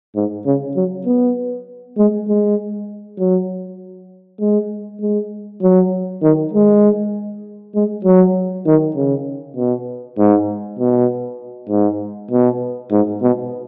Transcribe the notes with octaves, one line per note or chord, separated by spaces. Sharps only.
G#2
C#3
F#3
B3
G#3
G#3
F#3
G#3
G#3
F#3
D#3
G#3
G#3
F#3
D#3
C#3
B2
G#2
B2
G#2
B2
G#2
B2